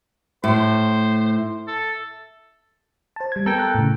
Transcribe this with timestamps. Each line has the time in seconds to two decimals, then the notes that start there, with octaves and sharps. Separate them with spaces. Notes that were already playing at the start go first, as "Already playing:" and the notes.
0.44 A2 C5
1.67 A4
3.16 C5 A5
3.32 G3 G#6
3.46 B3 A4 A#4 G5 A#5
3.58 A#5 F#6
3.75 A2 C#3